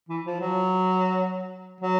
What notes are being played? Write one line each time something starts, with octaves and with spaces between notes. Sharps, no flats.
E3
F3
F#3
F#3